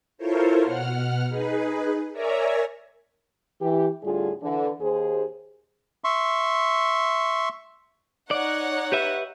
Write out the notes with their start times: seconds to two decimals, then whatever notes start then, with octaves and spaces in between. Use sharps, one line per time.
0.18 E4 F4 A4 A#4 C5 C#5
0.64 B2 F#5 F6
1.27 D#4 G#4 B4
2.13 A#4 C#5 D5 E5 G#5 A#5
3.62 E3 G4
4.03 A2 D3 G3 F4 G#4
4.42 D3 E3
4.81 D#2 G#4 C5
6.04 E5 C6 C#6
8.31 D#4 C#5 D5 F#5
8.92 G4 B4 E5